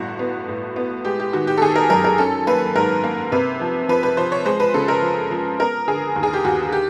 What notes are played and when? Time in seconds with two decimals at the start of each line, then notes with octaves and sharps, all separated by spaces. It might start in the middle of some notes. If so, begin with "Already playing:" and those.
Already playing: G1 A2 F#4
0.19 B3
0.48 A2
0.76 B3
1.05 G#3 G4
1.20 G4
1.33 D#3 F#4
1.47 G4
1.58 A4
1.62 D#3 G#4
1.76 A#4
1.90 F#2 A#4
2.04 A#4
2.18 C#4 A4
2.47 A#3 B4
2.75 G#2 A#4
3.04 A#3
3.32 C3 B4
3.61 F3
3.89 F3 B4
4.03 B4
4.17 F3 C5
4.32 C#5
4.45 G#3 C5
4.60 B4
4.74 C#3 A4
4.88 A#4
5.02 F3
5.31 F3
5.60 B3 A#4
5.88 D3 G#4
6.16 D#2
6.23 G#4
6.33 G4
6.45 D#2 F#4
6.72 G4